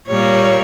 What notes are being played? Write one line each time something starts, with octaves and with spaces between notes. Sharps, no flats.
A#2 G3 A#3 C#5